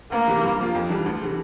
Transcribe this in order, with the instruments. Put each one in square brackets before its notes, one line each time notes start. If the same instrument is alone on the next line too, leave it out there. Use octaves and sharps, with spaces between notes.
[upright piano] D2 [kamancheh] A#3
[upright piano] C3 E3
G2
F3 A#3 F4
F2
E3 G3 D4
D2
C3 E3 A3